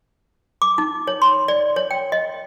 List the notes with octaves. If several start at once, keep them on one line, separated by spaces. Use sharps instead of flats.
D6
D#4
C#5
C6
D5
C#5
G5
D#5